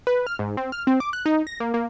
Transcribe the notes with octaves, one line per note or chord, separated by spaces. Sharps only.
B4
F6
G#2
C4
F6
C4
D6
F#6
D#4
A#6
A#3
A#3